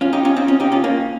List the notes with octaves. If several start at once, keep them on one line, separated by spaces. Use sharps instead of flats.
C#4 F4
D#4 G4
C#4 F4
C4 D#4
C#4 F4
D#4 G4
C#4 F4
A#3 C#4